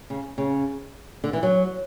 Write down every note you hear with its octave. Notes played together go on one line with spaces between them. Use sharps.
C#3
C#3
D3
E3
F#3